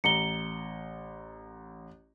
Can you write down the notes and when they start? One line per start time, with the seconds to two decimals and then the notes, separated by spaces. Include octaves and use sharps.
0.04 A1 A#5 C#7 G7